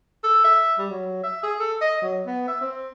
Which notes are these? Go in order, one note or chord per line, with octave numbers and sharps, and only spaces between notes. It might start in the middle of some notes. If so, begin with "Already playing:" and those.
A4
E5
G3
F#3
E5
G#4
A4
D#5
F#3
B3
E5
C4